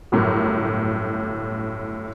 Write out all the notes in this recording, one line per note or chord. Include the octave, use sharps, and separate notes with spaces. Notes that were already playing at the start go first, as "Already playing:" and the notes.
G1 F#2 A2 A#4